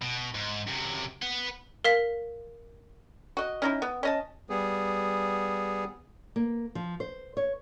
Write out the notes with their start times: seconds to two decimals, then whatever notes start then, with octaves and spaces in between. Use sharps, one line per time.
0.02 B2
0.35 G#2
0.67 F#2 C3
1.22 B4 F#5
1.84 A#4 F5 B6
3.37 F#4 D#5
3.62 C#4 D#4 E4
3.82 B3
4.03 C#4 D#5 A5
4.50 G3 B3 G#4
6.36 A#3
6.75 F3
7.00 C5
7.37 C#5